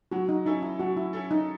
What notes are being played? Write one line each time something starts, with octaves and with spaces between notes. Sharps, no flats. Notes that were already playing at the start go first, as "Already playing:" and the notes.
F#3 F#4
D#4
C#4 D#4 E4 A4
E4
F#3 F#4
E4
C#4 E4 A4
D#4